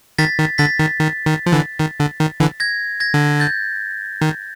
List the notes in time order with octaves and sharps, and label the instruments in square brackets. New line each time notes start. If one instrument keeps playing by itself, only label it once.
[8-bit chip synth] D#3 [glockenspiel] A6 B6
[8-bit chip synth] D#3
[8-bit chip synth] D3 [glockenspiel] A6 B6
[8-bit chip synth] D#3
D#3
D#3
F3
D3 E3
D#3
D3
D#3
D3 E3
[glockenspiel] G#6 A#6
G#6 A#6
[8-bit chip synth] D3
[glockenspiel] G6 A6
[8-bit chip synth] D#3